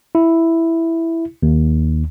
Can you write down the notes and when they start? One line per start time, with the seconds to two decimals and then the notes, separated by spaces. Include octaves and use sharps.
0.15 E4
1.43 D#2